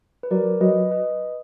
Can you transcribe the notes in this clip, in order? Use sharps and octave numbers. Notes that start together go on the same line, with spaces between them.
B4
F#3 A#4 D5
F#3 B4 D#5
B4 D#5